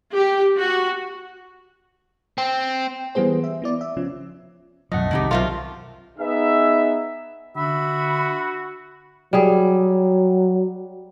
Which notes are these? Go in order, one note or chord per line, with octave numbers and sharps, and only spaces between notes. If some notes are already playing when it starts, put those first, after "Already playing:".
G4
F#4
C4
E3 G3 B3 G#4 C5
E5
B3 E4 D5
E5
C#3 F3 C#4
B1 F#2 F3 A3 D#5 F#5
C2 D#3 G#3 C4 D#4 G4
B1 F3 F#3 A3 F4 A#4 E5
B3 D#4 G#4 E5
D3 F#4 E5 B5
F#3 G3 G#4